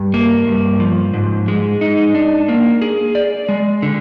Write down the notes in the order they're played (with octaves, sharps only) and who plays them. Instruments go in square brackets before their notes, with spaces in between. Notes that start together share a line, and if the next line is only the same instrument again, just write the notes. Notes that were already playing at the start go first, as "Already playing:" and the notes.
Already playing: [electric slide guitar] G2
A#3
G2
F3
G#2
G#3
D#4
D4
A#3
G#4
D5
G#3
D3